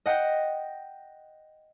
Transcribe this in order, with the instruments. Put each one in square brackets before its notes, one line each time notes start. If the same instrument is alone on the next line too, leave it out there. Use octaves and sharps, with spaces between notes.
[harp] D#5 F#5 G5 G6